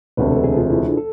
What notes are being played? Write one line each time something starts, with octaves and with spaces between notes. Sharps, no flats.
E1 D2 C3 B4
A4
G#4
F4
E4
D4
A4